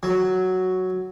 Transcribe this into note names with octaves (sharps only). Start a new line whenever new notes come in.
F#3